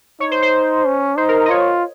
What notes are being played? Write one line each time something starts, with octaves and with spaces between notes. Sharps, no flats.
D#4 C#5
C5
C5
C#4
D#4 C5
A#4
D#5
F4 C#5